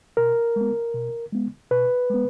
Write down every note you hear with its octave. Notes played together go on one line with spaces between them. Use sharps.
B2 A#4
G#3 B3
B2
G#3 B3
B2 B4
G#3 B3